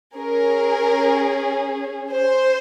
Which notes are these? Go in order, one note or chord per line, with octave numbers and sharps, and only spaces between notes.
C#4 G#4 A#4
C5